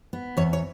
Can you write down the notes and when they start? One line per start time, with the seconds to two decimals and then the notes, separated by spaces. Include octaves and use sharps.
0.13 B3
0.37 E2 C#5
0.53 C#5